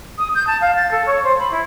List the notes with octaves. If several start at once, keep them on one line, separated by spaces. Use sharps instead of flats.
D#6
G6
A5
F5
A6
A4
C#5
C5
B5
E4